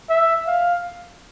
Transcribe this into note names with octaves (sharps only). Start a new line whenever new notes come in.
E5
F5